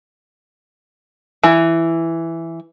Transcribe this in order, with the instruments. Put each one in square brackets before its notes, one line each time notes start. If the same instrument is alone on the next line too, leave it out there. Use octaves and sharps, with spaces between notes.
[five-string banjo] E3